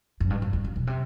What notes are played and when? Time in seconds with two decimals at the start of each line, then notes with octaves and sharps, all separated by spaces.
0.20 F#2
0.30 G2
0.42 F#2
0.53 E2
0.65 F#2
0.76 B2
0.87 C3